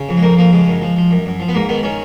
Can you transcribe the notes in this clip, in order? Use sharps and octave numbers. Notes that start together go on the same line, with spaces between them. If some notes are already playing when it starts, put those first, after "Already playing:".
Already playing: C#3
F2
G#3
F2 A#3
F3 A#3
C#3 G#3
F#2
F3
F3
F#2
F#2
F3
B3
G#2 A#3
D#3 B3
D#3 C#4